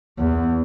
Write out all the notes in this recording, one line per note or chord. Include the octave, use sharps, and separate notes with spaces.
E2